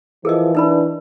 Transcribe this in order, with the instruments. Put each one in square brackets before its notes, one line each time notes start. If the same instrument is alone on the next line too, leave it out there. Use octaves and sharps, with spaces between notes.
[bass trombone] E3 [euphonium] F3 [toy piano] G#4 A#4 D#5
[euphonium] D4 [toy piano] D#4 B4 B5